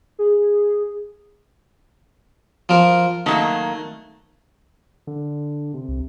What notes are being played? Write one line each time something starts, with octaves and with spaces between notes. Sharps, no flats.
G#4
F3 A#4
D#3 F#3 A3 A#3
D3
C3
C2